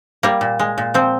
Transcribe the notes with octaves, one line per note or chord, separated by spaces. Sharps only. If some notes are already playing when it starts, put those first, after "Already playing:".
G3 A#3
A#2
G#3
A#2
F3 C4